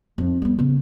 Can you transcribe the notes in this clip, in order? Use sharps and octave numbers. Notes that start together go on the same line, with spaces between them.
F2 G#2
G3 B3
C#3 B3